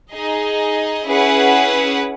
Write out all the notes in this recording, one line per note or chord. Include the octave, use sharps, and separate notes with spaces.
D#4 G#4 D#5
C#4 E4 G#4 B4 F#5